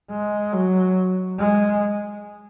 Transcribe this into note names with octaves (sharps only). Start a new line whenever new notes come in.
G#3
F#3
G#3